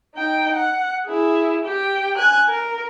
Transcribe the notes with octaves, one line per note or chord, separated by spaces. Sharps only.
D#4 G5
F#5
E4 G#4
G4 G5
G#5 F#6
A#4